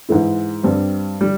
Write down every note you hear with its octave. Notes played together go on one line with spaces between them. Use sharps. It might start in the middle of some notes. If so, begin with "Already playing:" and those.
G#2 E3 G#3 E4
G2 G3 C4
G3